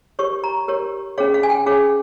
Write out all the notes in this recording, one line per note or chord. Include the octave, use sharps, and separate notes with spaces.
G4 A#4 C#5 C#6
A#5
G4 A#4 C#5
C#4 G#4 C#5 F5
F5
G#5
G5
C#4 G#4 C#5 F5